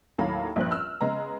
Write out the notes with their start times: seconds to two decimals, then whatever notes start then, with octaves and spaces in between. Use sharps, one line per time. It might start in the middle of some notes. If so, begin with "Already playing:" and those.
0.18 D#2 A2 F#3 A4 F5 B5
0.56 A#1 G2 C5 F#6
0.71 E6 F6
1.01 C#3 G#3 B3 A#5